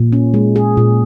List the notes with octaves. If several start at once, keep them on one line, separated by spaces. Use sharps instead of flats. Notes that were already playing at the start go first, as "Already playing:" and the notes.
Already playing: A#2
C#4
G#3
G#4
A#2